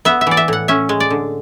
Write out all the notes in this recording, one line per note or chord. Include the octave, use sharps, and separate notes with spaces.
B3 E5
E5
E3 D5
E5
A2 F#5
C#4 E5
G#3
D5
D3